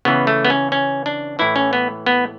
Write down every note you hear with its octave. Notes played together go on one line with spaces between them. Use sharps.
C#3 E3 B3
A3
B3
C#4
C#4
D4
A2 E3 E4
C#4
B3
B3